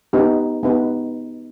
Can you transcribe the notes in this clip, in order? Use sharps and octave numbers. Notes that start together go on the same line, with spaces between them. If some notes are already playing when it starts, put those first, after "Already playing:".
B3 D#4 G4 B4
B3 D#4 G4 B4